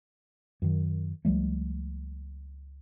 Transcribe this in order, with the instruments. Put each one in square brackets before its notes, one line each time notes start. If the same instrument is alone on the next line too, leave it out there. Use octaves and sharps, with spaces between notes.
[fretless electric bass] F#2 D#3
C#2 F3 G3 A3